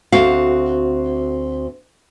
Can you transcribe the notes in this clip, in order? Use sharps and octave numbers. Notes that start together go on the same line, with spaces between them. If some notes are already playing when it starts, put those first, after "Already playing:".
D2 C4 F#4 F5